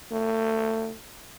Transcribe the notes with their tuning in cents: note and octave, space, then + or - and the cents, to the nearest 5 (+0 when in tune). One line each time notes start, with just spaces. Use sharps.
A3 +25